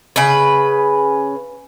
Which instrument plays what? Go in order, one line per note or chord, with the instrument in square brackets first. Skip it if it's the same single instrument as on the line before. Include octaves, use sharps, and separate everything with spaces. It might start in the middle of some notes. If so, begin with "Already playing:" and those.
[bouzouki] C#3 B4